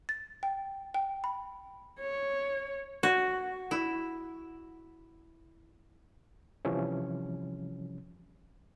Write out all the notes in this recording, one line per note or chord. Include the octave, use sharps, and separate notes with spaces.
A6
G5
G5
B5
C#5
F#4
E4
C3 E3 F3 G3 C#4